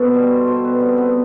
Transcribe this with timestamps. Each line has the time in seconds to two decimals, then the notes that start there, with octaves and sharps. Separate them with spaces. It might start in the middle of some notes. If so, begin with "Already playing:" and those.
Already playing: B2 A4 C5
0.14 G3
0.47 B2 C5
0.65 B4
0.80 G3 C4
0.98 B3